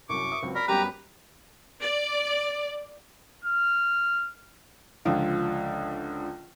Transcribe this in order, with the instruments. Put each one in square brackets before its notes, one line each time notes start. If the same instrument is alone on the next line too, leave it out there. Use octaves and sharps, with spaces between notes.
[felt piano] C2 F#2 [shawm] C#6 [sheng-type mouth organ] D6
[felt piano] E5 D#6
C#2 F#3 C4
[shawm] A#4 [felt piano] D5 [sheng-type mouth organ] B5
[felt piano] F#2 G3 B3 [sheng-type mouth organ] G4 A#5 [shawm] B4
[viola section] D5
[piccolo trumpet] F6
[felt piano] C#2 D3 F3 F4